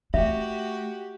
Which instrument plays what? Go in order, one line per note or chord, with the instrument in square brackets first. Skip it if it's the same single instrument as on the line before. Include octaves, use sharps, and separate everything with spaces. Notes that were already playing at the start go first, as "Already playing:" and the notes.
[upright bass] A3 [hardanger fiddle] F#4 G4 [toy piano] E5